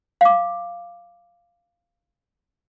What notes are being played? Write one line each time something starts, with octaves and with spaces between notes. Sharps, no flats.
F5 D6